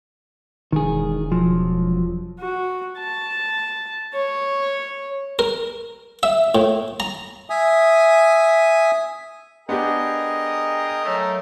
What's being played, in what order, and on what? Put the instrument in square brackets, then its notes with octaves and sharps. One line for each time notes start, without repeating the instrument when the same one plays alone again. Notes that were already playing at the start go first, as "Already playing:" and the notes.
[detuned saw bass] E1 [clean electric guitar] D#3 G#4
[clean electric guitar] F3 F#3
[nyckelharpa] F#4
A5
C#5
[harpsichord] A#4
E5
A2
A#5
[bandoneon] E5 G#5 D#6
[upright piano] B3 D4 G4 [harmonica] G#4 A#4 G5 [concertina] D#5
[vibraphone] F#3 C#5 E6 [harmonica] A3 D#4 A#4